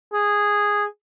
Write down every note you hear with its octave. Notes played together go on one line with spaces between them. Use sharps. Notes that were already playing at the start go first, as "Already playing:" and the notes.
G#4